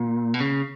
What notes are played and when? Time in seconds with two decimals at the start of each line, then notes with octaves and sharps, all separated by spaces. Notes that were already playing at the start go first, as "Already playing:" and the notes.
Already playing: A#2
0.34 B2
0.40 C#3